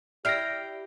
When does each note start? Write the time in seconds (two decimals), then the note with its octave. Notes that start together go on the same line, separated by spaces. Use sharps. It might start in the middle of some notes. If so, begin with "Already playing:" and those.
0.25 E4 G4 D5 G5 F6 A#6 C7 D7